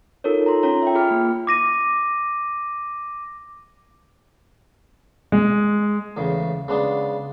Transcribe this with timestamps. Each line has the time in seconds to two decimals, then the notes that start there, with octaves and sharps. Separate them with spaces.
0.24 D#4 F4 A4 A#4 C#5
0.46 A#5 C6
0.63 C#4 F4 C#5 A#5
0.82 E5 G5
0.95 F4 G#4 B5 F6
1.11 A#3
1.47 D6 A#6 D#7
5.32 G#3
6.17 E2 A2 C#3
6.68 C#3 G#3 B3 D4